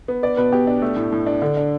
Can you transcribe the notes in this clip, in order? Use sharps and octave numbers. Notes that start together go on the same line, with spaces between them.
B3
B3 D5
B2 B4
B2 G4
D4
A3
A2
A2
D4
D3
D4